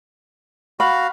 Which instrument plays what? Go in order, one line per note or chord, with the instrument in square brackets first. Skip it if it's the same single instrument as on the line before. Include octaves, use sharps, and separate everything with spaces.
[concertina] F#4 F5 [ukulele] B5